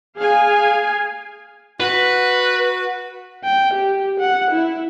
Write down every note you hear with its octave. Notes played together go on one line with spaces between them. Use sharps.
G#4 F5 G#5
F#4 B4
G5
G4
F#5
E4